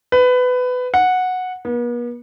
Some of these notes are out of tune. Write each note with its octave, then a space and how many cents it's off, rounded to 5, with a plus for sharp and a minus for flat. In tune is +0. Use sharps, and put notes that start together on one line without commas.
B4 +20
F#5 -10
B3 -45